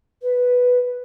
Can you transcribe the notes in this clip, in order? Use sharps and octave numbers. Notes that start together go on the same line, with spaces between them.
B4